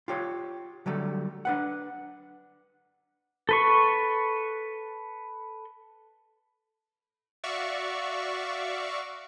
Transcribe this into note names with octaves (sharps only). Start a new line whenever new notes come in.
F4 G4 C#5
D3 F#3 G3 A3
D4 B4 F#5
A4 B4 C#6
F#4 D5 E5 F5 C#6